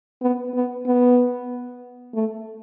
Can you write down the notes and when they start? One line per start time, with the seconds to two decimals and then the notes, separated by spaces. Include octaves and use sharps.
0.22 B3
0.54 B3
0.86 B3
2.14 A3